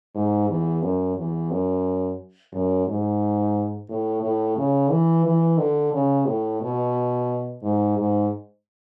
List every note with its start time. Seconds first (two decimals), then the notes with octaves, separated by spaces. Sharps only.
0.15 G#2
0.49 E2
0.82 F#2
1.17 E2
1.51 F#2
2.53 F#2
2.87 G#2
3.89 A2
4.22 A2
4.57 C#3
4.91 E3
5.26 E3
5.59 D3
5.93 C#3
6.26 A2
6.62 B2
7.63 G#2
7.98 G#2